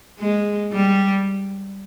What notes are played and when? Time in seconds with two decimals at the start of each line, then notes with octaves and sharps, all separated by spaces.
0.19 G#3
0.73 G3